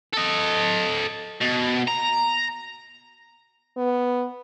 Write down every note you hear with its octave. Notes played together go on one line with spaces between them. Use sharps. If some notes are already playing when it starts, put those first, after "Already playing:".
A4 D#5
B2
A#5
B3